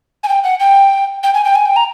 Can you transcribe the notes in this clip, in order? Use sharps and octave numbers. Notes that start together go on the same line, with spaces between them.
G#5
G5
F#5
G5
G5
G#5
G5
G#5
G5
A#5